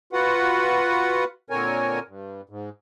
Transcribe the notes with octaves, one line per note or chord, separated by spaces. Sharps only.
F4 F#4 B4 F#5
A#2 D3 C4 A#4 C#5 G#5
G2
G#2